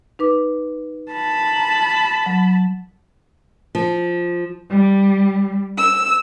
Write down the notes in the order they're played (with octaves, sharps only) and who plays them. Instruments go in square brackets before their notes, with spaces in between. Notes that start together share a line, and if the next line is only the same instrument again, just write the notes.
[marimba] D#4 B4 D6
[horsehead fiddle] A5 B5
[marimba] A#5
F#3
[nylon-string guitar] F3
[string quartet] G3
E6